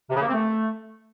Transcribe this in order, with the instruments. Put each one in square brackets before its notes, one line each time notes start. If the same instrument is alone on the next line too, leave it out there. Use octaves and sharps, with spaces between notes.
[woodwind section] C3
C#3
A#3
C4
A3